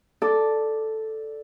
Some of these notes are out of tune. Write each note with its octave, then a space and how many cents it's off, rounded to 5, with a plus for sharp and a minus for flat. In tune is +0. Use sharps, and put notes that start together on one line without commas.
A4 +0 D5 +0